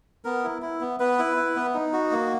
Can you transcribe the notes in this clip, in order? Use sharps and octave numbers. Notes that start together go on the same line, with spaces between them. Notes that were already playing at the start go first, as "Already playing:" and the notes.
B3 A#4
E4
E4
B3
B3 B4
E4
E4
B3
D#4
F#4
A#3